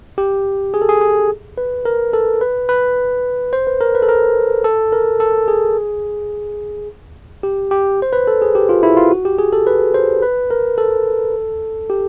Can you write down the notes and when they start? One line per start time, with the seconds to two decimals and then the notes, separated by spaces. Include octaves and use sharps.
0.18 G4
0.74 G#4
0.82 A4
0.89 G#4
1.01 G#4
1.58 B4
1.85 A#4
2.13 A4
2.41 B4
2.69 B4
3.53 C5
3.67 B4
3.81 A#4
3.95 B4
4.02 A4
4.09 A#4
4.64 A4
4.92 A#4
5.20 A4
5.48 G#4
7.43 G4
7.71 G4
8.02 C5
8.13 B4
8.27 A4
8.42 G#4
8.55 G4
8.69 F4
8.83 E4
8.97 F4
9.11 F#4
9.25 G4
9.39 G#4
9.53 A4
9.67 B4
9.94 C5
10.22 B4
10.51 A#4
10.78 A4
11.90 G4